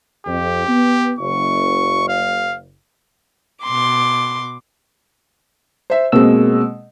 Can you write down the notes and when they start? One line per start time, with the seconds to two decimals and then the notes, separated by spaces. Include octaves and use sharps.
0.27 F2 G4
0.68 B3
1.19 F#1 C#6
2.09 F5
3.63 B2 C6 D6
5.90 C5 E5
6.12 B2 G#3 A#3 C4 E6